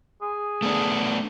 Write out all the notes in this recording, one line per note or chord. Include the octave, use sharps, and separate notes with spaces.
G#4
A3 B3 D4